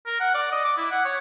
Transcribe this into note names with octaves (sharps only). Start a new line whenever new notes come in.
A#4
F#5
D5
D#5
D6
E4
F#5
C#5